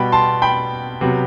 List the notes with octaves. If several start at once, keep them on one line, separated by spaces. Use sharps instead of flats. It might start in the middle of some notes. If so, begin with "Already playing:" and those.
Already playing: B2 G3 B3 G5 B5
A5 C6
G5 B5
C3 F#3 B3